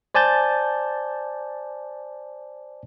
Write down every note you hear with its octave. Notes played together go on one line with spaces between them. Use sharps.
C5 D5 G#5 A5 G6 A6